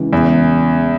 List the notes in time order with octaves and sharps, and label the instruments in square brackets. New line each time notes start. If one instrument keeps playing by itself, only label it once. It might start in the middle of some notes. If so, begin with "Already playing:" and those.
Already playing: [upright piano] C#2 C#3 E3
[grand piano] E2